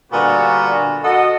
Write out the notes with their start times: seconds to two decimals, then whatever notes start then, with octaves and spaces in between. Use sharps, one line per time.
0.12 A#2 D3 G3 B3 F#4
1.03 F#4 A4 D#5